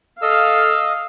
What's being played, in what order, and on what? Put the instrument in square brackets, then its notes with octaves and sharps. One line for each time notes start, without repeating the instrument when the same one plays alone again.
[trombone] A4 [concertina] D#5 [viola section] F5 [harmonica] E6